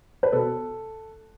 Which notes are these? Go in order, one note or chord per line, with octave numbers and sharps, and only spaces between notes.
B4
B2 A4